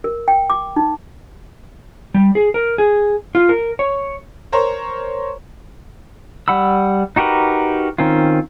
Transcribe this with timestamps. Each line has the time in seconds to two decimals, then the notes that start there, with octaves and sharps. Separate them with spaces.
0.04 A#4
0.28 G5
0.50 D6
0.76 D#4
2.14 G3
2.35 G#4
2.54 A#4
2.78 G#4
3.35 F4
3.49 A#4
3.79 C#5
4.52 A#4 C5 C#5 A#5
6.48 G3 F#5 B5 E6
7.16 D#4 F#4 G4 A#4 B4
7.98 D#3 C4 C#4 F4